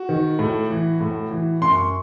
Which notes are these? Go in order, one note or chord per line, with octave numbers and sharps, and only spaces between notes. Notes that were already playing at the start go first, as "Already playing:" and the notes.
Already playing: F#4
D#3
A2
E3
A2
E3
F#2 C6
C#6